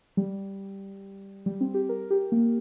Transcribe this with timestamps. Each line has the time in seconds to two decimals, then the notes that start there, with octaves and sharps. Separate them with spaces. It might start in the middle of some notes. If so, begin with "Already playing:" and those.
0.17 G3
1.46 G3
1.61 C4
1.74 G4
1.89 A#4
2.11 G4
2.32 A#3